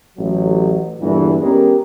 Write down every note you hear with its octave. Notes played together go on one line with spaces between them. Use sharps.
A1 F#3
E2 G2 A#2 D3 E3
G#3 B3 C#4 G4 A#4